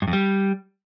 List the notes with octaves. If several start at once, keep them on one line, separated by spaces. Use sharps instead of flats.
G2
F2
G3